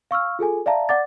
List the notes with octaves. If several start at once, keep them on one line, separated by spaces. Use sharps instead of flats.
F5 C#6 E6 F6
F4 G#4 A4 G#5
D5 E5 F5 A5 A#5
D5 F#5 D6 A6